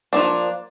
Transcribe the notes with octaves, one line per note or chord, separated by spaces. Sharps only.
F3 A#3 D4